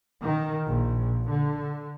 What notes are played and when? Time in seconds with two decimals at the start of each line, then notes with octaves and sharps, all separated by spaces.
0.21 D#3
0.66 A#1
1.29 D3